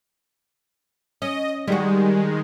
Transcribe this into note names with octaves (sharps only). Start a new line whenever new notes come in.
C#4 D#5
D#3 G3 G#3 F#4